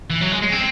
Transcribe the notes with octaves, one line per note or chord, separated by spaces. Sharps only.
E3
F#3
G#3
G#3
C4